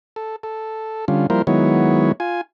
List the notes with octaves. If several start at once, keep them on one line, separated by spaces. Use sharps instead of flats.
A4
A4
D3 G3 C#4 F4
F3 G3 A#3 E4 A#4 C5
D#3 F#3 G#3 B3 E4 C#5
F4 G#5